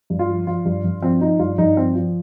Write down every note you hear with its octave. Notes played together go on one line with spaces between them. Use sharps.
G2
F4
F3
F3 F4
G2
G2
F3 C4
F3 D#4
G2 F4
G2 D#4
F3 C4
F3